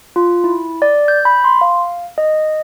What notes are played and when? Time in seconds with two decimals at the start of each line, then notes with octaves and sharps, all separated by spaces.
0.16 F4
0.44 E4
0.82 D5
1.08 G6
1.25 B5
1.44 C6
1.61 F5
2.18 D#5